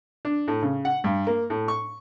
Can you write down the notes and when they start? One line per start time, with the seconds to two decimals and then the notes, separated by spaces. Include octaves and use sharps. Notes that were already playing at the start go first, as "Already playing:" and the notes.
0.25 D4
0.48 A2
0.62 C#3
0.85 F#5
1.04 G2
1.27 A#3
1.50 A2
1.68 C#6